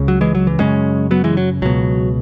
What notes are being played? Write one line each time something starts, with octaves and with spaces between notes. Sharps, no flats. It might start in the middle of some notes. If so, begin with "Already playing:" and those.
Already playing: C#2 C#3
F#3
E3 G#3
F#3
E3
F#2 C#3 G#3 C#4
F#3 B3
E3 G#3
F#3
C#2 B2 F#3